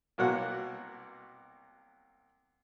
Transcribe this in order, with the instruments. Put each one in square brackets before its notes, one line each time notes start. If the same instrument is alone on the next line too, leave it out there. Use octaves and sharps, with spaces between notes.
[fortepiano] C2 B2 F#3 A#3 F#5